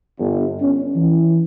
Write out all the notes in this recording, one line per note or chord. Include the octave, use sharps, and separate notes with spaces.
G1
C#4
E3